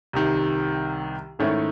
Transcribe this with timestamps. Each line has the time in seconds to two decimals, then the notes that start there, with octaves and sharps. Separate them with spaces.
0.13 C2 C3 D#3
1.39 G#2 D#3 A3 C#4 E4